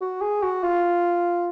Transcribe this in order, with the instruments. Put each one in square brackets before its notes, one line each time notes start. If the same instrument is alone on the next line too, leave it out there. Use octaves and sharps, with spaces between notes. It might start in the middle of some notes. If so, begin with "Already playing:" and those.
[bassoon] F#4
G#4
F#4
F4